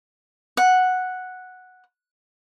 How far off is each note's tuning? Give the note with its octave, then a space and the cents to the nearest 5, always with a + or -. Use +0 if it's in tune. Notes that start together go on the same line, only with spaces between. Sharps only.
F#5 -5